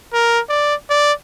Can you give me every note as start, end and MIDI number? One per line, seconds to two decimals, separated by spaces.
0.14 0.40 70
0.49 0.75 74
0.90 1.13 74